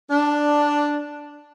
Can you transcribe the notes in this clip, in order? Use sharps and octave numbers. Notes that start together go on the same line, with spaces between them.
D4